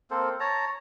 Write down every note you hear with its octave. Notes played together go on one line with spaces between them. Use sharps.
A#3 C4 A4 C5
C#5 A5 A#5